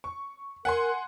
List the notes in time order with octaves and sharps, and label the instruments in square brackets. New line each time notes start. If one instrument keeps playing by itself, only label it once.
[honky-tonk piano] C#6
[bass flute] A#4 [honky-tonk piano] F#5 G#5 C6